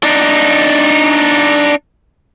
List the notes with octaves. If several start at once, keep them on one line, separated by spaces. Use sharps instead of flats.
D4 D#4